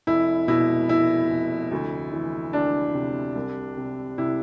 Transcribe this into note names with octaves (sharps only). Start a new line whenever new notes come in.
F1 E4
B2 E4
F1 E4
F1
D2
E3
D2 D4
C3
C2
C3
C3 E4